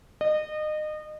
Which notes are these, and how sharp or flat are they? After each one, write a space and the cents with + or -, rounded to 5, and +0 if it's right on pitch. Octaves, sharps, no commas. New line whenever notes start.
D#5 -30